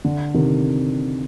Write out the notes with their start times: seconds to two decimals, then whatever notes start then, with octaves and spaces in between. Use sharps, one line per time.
0.05 D3
0.34 C3 D#3